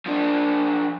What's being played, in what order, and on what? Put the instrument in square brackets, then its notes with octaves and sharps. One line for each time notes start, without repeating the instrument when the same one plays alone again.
[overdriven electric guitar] F3 D4